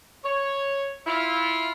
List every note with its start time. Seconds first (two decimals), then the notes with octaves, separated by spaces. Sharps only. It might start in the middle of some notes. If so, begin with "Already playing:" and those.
0.24 C#5
1.07 E4 F4